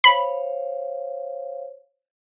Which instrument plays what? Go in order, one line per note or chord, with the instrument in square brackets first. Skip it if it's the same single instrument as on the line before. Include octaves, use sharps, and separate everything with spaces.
[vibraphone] C5 C#5 F5 [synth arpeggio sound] B5